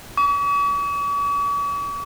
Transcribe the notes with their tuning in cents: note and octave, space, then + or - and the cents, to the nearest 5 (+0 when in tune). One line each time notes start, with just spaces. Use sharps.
C#6 +45